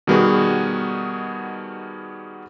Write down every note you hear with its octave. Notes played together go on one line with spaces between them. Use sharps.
B2 D#3 G3 B3 F#4 G#4